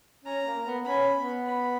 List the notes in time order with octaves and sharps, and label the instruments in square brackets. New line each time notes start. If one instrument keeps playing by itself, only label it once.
[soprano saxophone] C#4 [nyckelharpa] A#5
[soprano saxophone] A#3
B3
[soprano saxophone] C#4 [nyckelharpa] B5
[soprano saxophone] B3
[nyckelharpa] B5